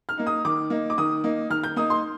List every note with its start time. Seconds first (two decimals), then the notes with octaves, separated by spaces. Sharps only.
0.09 F6
0.18 A#3 D#4
0.27 D#6
0.45 D#3 D6
0.70 A#3 D#4
0.90 D6
0.98 D#3 D#6
1.24 A#3 D#4
1.50 D#3 F6
1.64 G6
1.76 A#3 D#4 D#6
1.90 C6